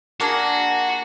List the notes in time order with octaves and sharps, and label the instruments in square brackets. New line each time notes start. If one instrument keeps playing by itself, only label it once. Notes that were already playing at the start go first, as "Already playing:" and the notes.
[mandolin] A#3 D4 G#4 [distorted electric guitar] F#4